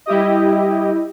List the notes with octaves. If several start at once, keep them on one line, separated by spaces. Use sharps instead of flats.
G3 E4 G4 D#5